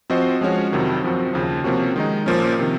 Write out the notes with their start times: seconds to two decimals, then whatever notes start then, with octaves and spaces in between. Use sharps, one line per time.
0.10 F3 C4 F#4 C5 D#5
0.41 F3 G#3 C#4 F#4 C#5
0.72 F2 C3 D#3 F#3
1.03 F#2 F3 C4 F#4
1.33 D#2 C#3 F3
1.64 C3 F3 A#3 C#4 F#4
1.96 D#3 G#3 D#4
2.26 A#2 F3 A#3 C#4
2.59 C3 D#3